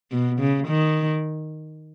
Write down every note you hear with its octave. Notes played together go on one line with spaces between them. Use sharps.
B2
C#3
D#3